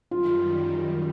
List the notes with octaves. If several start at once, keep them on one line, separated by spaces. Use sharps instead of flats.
F#2 D#3 G3 F4